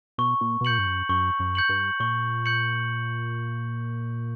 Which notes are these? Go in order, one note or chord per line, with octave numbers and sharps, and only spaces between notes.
B2 C#6
A#2
B2
A#2 G6 C#7 F#7
G2
F#2
F#2 C#6
F#2
G6 C#7 F#7
G2
A#2 C#6
G6 C#7 F#7